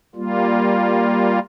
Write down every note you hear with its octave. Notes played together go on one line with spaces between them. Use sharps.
G3 A#3 F4